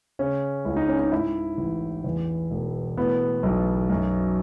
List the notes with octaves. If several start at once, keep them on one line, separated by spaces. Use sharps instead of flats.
C#3 C#4
C#2 E4
D#4
C#4
D#4
G#2 E4
A1
E2
E1
A2 B3
B1
F#2